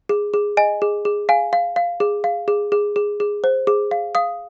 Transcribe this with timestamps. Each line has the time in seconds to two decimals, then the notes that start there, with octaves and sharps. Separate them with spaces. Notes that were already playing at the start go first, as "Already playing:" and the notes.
0.09 G#4
0.34 G#4
0.57 D#5 G#5
0.82 G#4
1.05 G#4
1.29 F5 G#5
1.53 F5
1.76 F5
2.00 G#4
2.24 F5
2.48 G#4
2.72 G#4
2.96 G#4
3.20 G#4
3.44 C5
3.67 G#4
3.91 F5
4.15 F5 D#6